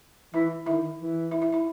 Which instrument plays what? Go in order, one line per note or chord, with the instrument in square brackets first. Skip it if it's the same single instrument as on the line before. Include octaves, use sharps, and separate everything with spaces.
[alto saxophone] E3 [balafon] E4 E5
[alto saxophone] D#3 [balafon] E4 E5
[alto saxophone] E3
[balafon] E4 E5
E4 E5
E4 E5